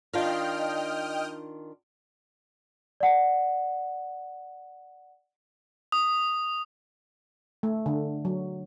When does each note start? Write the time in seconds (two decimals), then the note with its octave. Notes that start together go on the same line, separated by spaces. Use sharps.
0.13 D#3 D4 F4 D#5 G5 F6
3.00 D5 F#5
5.92 D#6
7.63 A3
7.86 D3
8.25 F#3